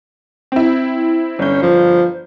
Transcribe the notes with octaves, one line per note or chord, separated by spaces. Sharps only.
C4 E4
G1 C#4 G6
F3